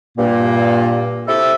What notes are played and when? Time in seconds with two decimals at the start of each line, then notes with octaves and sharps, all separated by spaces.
0.17 G2 A#2 A#3
1.27 C4 E4 G4 A4